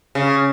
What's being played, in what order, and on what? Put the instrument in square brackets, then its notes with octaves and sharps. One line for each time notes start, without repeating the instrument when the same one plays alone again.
[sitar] C#3